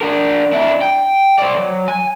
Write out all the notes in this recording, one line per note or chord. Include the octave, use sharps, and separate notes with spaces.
D4 A#4
D4 E4
G5
C5 D5
F#3
G#5